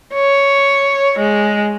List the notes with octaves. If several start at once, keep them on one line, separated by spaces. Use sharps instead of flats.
C#5
G#3